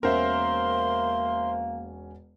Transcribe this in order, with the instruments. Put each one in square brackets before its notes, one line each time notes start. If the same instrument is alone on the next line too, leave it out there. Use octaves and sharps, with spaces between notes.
[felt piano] E1 C#4 F#5 [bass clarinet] A#3 [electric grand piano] A#4 C5 E5 [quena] C6